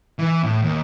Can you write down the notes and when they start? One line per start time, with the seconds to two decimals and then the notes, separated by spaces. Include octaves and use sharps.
0.19 E3
0.43 A2
0.62 D#2